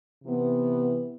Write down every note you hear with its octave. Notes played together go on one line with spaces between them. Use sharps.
C3 E3 B3